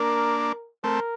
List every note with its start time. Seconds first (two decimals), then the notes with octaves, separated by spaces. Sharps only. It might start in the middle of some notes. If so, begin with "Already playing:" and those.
Already playing: A#3 D4 A#4
0.84 A3 C4 A#4